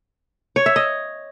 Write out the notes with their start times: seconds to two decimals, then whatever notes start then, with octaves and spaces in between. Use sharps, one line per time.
0.56 C#5
0.66 E5
0.76 D#5